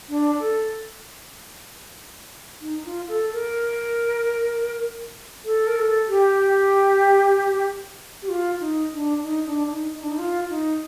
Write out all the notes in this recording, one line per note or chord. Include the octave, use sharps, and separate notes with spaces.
D4
A4
D#4
F4
A4
A#4
A4
A#4
A4
G4
G4
F4
D#4
D4
D#4
D4
D#4
D#4
D4
D#4
F4
D#4